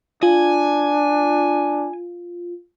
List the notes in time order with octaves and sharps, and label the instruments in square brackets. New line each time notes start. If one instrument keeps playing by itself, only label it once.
[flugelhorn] D4 [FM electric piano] F4 [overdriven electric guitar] G#5